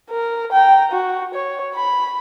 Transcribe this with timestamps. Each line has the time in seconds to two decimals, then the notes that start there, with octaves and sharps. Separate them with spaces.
0.10 A#4
0.52 G5 A#5
0.92 F#4
1.34 C#5
1.75 B5